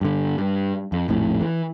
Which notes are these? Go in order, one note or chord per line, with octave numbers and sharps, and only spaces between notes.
G2 D3
G2
F2
A#1 F2 A2
E3